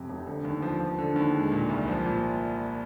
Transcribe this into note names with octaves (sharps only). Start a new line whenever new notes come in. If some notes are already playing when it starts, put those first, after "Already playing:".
Already playing: F2 C3
F1
D3
D#2
F3
F3
D3
D#2
G#3
A#2
C2
F3
A#2